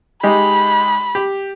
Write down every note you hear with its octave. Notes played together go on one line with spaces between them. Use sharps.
G#3 D#4 G4 B5
G4